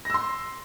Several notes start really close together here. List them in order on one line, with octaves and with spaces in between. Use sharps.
A#6 E6 C6